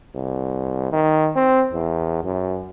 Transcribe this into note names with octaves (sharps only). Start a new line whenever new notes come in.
C2
D#3
C4
E2
F#2